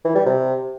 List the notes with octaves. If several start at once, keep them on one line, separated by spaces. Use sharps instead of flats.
E3
G3
C3